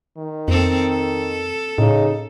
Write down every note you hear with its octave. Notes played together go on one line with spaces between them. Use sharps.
D#3
F2 C4 A4
A4
A2 C#3 D#4